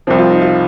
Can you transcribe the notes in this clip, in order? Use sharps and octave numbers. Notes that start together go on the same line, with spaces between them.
C2 C3 F3 C4
F4
D#4
F4